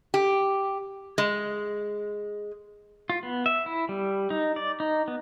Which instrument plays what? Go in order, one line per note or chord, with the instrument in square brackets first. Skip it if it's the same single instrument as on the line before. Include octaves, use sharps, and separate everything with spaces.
[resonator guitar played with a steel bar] G4
G#3
[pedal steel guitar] F4
B3
E5
E4
G3
D#4
D5
D#4
B3